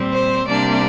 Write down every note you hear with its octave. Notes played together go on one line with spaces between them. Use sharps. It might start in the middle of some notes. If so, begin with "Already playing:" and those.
Already playing: A#2 G3 C4
C5
C3 G3 A#3 D4 D5